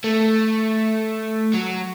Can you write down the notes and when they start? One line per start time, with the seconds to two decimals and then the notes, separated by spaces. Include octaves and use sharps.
0.04 A3
1.54 F#3